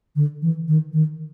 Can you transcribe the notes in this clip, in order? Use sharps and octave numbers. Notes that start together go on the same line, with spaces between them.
D3
E3
D#3
D#3